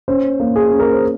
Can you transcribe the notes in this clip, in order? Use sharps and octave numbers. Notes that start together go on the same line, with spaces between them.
C#4 C5
A#3
G#4
C#4
A#4
C5